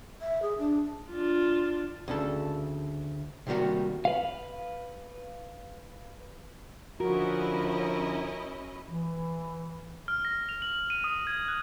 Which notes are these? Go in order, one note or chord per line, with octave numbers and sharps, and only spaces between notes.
E5
G#4
D4
D4 F4
D2 C#3 A4
C3 D#3 G3 A#3 F#4
B4 F5
D3 F3 C#4 E4 F#4 A#4 D#5
E3
F6
A#6
F7
F#7
D#7
D#6
G#6
F#6